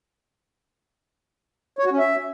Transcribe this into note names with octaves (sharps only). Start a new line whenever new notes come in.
C#5
F#4
C#4
E5